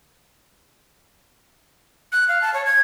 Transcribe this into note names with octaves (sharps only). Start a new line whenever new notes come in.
F#6
F5
A5
C#5
G#6